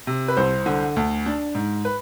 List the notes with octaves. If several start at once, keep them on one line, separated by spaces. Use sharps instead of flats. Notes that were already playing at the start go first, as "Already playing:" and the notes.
C3
B4
C2 C5
D3
D2
D4
G#2
B4